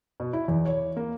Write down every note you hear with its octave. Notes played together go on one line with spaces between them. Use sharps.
B2
E4
E2
C#5
A#3